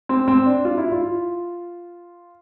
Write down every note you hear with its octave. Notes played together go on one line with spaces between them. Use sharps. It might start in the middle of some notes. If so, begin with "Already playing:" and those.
C4
C4
D4
F4
E4
F4